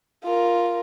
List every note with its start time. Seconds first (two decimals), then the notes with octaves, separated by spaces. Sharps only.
0.24 F4 A#4